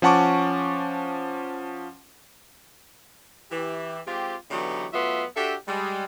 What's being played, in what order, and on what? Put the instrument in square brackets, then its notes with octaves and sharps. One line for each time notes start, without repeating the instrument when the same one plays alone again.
[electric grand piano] F3 C#4 F#5 A5 C#6 D6
[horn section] E3 G4
G#3 C4 F4 G4
D3 E3 F#3 B3 D#4 G4
F#3 A3 B3 F4 E5 C6
D4 F#4 G4 A4 E5 G5
G3 G#3